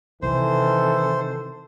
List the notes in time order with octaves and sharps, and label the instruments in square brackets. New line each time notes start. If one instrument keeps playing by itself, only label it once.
[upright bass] C3 [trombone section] D#3 A4 [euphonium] E3 [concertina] C5